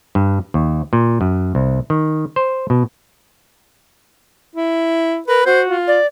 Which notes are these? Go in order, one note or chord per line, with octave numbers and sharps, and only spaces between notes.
G2
D#2
A#2
F#2
C2
D#3
C5
B2
E4
A#4 B4
F#4 C5
F4
D5